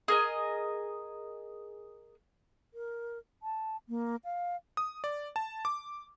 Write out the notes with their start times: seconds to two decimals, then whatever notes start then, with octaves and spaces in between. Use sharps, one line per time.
0.08 G#4 A#4 D#5
2.74 A#4
3.43 A5
3.89 A#3
4.24 F5
4.77 D#6
5.04 D5
5.36 A5
5.65 D6